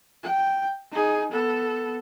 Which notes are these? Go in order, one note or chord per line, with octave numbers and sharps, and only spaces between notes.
G5
D#4 G#4
B3 A4